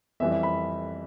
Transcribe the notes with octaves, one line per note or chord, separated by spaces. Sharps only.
F2 E3 G3 E5
E5
B5